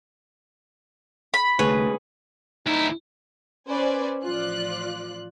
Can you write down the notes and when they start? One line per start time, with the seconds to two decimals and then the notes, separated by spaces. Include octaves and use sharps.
1.34 B5
1.59 C2 D3 A3 G#4 B4 C#5
2.66 D2 D#4 E4
3.69 C#4 B4 C5 D5 G#5
4.24 A1 F3 F4 D5 F#6